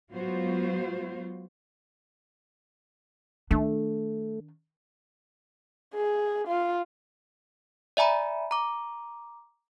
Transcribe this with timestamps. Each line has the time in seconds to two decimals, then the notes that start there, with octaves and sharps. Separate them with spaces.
0.12 F#3 G#3 B3 F4 F#4 C5
3.51 D#3 A3 D4
5.94 G#4
6.48 F4
7.97 D5 E5 G#5 A#5 B5
8.51 A#5 D6